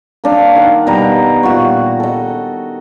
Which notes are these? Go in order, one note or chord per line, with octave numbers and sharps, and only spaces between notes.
A#3 D4 F5
D#3 F#5
B2 G3 A#5
A#2 F#4 F#5 C#6
A4 D#5